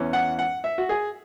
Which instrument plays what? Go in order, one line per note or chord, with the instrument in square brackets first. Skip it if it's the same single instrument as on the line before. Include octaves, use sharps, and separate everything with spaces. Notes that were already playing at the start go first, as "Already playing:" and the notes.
Already playing: [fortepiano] E2 E3 C#4
F#5
F#5
E5
F#4
G#4